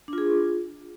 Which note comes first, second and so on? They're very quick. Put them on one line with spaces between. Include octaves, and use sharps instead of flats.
D4 F4 G#4